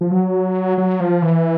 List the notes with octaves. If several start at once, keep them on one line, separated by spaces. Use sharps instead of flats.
F3
F#3
F#3
F3
E3